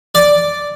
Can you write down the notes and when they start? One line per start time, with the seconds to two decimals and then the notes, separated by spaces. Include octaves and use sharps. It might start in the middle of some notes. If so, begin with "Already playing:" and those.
0.15 D5